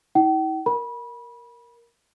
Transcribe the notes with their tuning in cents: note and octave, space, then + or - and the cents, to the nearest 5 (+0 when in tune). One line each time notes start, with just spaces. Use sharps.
E4 -45 G5 -45
A#4 +0 B5 -25